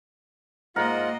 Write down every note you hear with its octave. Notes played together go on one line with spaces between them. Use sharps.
G#2 A#3 F4 A#4 D#5 F#5